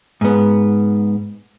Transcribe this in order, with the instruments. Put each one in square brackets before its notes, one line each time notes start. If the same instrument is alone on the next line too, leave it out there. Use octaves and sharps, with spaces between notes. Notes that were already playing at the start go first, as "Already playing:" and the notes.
[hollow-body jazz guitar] G#2 B3